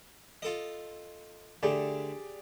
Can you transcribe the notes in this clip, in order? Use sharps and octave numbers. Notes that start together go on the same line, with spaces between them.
F4 A4 D#5
D3 A3 G4 G#4 D5